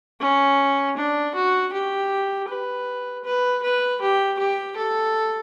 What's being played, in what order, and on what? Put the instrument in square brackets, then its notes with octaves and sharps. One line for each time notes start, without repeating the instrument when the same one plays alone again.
[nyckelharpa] C#4
D4
F#4
G4
B4
B4
B4
G4
G4
A4